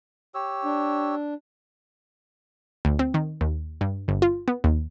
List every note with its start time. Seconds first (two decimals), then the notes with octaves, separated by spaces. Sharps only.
0.35 G4 C#5 E6
0.65 D4
2.85 D2
2.99 C4
3.14 D#3
3.41 D#2
3.81 G2
4.08 G1
4.22 F4
4.48 B3
4.64 D#2